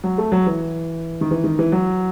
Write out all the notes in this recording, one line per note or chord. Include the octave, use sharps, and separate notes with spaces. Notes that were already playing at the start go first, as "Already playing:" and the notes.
F#3
A3
F#3
E3
D#3
E3
D#3
E3
F#3